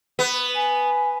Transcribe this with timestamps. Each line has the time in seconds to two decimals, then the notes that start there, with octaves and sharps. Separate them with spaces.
0.19 B3
0.55 G#5